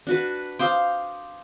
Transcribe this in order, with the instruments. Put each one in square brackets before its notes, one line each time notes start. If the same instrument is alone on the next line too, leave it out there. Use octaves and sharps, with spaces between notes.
[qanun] D4 F#4 B4
[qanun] C5 F5 G5 [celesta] C6 D6 D#6